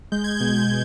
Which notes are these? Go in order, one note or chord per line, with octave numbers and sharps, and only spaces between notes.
G#3 G6
G#6
B2 G6
G#6